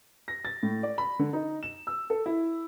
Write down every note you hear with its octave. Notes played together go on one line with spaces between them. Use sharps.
A#6
A6
A2
D5
B5
D3
D#4
E7
E6
A4
E4